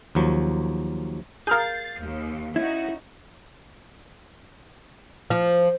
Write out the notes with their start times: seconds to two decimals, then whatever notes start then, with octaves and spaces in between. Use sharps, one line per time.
0.15 D#2 F3 F#3
1.47 G#4 A#4 F5 F6 G6 A6 C7
2.00 D#2
2.56 C#4 D#4 E4 F#4
5.30 F3